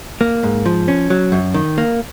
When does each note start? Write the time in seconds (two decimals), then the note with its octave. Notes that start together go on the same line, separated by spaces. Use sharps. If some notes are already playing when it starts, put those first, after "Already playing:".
0.21 A#3
0.43 G#2
0.66 F3
0.88 C#4
1.10 F#3
1.32 F#2
1.54 D#3
1.78 A#3